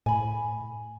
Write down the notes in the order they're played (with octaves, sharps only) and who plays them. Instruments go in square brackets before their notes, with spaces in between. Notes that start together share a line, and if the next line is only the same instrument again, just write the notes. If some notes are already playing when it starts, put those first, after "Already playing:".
[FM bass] A2 [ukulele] G#5 B5